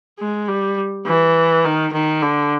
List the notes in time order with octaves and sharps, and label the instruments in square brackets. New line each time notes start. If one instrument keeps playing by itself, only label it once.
[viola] G#3
G3
E3
D#3
D#3
D3